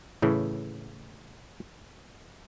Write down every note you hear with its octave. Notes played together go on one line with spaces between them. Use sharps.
A2 C#3 E3